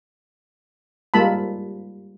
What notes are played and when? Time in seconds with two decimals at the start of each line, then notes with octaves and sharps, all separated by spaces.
1.14 G3 G#3 A#3 F4 A5 B5